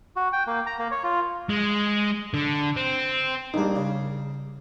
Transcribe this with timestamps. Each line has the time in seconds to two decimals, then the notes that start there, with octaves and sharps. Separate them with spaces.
0.16 F#4
0.33 G5
0.47 A#3
0.67 A#5
0.79 A#3
0.91 C#5
1.04 F4
1.49 G#3
2.34 D3
2.76 C4
3.54 A#1 G3 A#3 D4 D#4
3.75 C#3